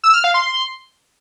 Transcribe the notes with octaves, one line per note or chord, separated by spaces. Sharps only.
E6
F6
F5
C6